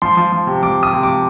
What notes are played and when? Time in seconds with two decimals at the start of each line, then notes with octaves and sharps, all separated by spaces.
0.02 F3 C6
0.17 F3
0.32 F3
0.47 C3
0.62 F3 D6
0.77 C3
0.83 D#6
0.93 C3
1.03 F3 D6